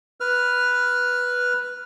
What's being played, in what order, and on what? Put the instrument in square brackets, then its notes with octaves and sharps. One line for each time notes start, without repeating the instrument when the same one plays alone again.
[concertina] B4 F6